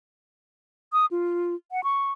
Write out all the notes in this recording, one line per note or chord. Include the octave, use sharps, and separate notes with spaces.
D#6
F4
F#5
C#6